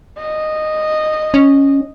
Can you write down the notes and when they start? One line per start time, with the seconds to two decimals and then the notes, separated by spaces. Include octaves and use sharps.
0.19 D#5
1.34 C#4